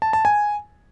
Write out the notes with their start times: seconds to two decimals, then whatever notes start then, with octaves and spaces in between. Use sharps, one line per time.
0.02 A5
0.13 A5
0.25 G#5